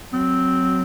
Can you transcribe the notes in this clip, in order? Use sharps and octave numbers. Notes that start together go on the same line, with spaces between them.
F#3 C4